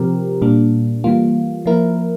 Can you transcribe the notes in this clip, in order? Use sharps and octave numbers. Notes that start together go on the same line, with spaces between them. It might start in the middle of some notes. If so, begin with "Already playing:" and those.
Already playing: C3 F3 C4 G4 A#4
A#2 G3 A#3 D4
E3 G3 A#3 F4
F3 A#3 E4 A#4